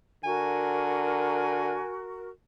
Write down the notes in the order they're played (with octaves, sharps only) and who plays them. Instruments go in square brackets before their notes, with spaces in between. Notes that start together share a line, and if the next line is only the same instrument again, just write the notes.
[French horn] D3 [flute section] F#4 A#4 [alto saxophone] G#5